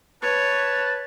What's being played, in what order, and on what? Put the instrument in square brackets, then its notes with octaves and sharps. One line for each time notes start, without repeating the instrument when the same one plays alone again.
[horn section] B4 [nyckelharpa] C#5 [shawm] A5